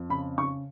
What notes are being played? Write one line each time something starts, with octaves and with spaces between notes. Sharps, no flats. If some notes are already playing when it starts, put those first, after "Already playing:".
Already playing: F2
C#3 B5
C#3 C#6